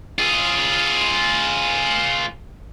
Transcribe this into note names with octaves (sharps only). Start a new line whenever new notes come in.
F4 G#4